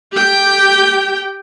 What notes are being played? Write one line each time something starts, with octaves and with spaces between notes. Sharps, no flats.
G4 G5